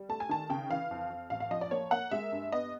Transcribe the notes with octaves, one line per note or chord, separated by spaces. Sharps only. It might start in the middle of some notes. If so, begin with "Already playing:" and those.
Already playing: G3
A3 A5
G#5
D#3 A5
C#3 G5
E3 F5
F2
F2
A1 F5
F5
F3 D#5
D5
A#3 C#5
A#3 F#5
G#3 E5
G2
B3 D#5